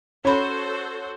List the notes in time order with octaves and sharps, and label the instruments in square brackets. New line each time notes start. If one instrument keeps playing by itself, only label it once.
[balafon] C#4 B5 [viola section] F#4 A4 C5 [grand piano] C#5